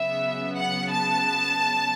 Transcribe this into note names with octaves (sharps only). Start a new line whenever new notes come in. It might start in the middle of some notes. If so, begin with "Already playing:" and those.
Already playing: C#3 F#3 B3 E5
F#5
A5